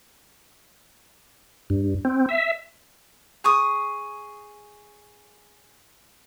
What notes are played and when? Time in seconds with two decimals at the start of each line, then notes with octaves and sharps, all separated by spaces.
1.70 G2
2.05 C4
2.29 E5
3.44 G#4 C#6 D#6